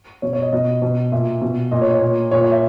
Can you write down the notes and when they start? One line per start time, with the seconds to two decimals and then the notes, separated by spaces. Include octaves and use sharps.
0.22 B2 C#5
0.33 C#5
0.42 D#5
0.53 B2 D#5
0.82 B2
1.12 A#2 E5
1.42 B2
1.71 A#2 D#5
1.81 C#5
1.92 C#5
2.02 A#2
2.31 A#2 C#5
2.42 C#5
2.52 E5